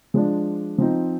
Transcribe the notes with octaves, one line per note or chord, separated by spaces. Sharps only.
F3 G#3 D4
F3 C4 D#4